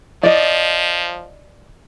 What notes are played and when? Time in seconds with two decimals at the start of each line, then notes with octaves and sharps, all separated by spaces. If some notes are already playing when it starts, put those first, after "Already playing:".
0.23 F3 D5 D#5